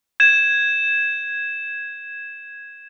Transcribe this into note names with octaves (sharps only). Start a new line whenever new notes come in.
G#6 E7